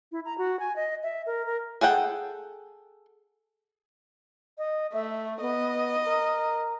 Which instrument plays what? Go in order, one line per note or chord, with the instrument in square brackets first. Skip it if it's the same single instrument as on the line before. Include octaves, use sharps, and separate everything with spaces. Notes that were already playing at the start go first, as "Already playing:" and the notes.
[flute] E4
A#5
F#4
G#5
D#5
E5
A#4
A#4
[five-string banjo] G#4 A4 F#5 G5
[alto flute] D#5
[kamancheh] A3 [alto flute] E5
[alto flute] B3 [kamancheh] D#5
[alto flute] A#4